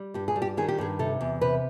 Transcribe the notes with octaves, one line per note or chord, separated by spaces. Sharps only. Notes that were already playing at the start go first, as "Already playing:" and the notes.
Already playing: G3
G2 G4
G#4
G3
G4
D#3 G#4
G4
G2 G#4
C3 A4
E2
C3 B4